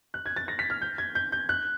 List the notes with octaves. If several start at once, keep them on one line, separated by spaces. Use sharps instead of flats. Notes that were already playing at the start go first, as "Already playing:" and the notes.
F#6
G#6
A6
A#6
B6
F6
G6
G#6
G6
G6
F#6